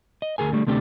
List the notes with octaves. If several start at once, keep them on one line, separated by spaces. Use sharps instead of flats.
D#5
D2 G#4 A#4 G#5
D3 G3 A3
D2 C3 A3 D4 G4